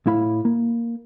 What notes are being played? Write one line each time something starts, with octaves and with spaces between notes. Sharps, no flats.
A2 E4 F5 B5
A#3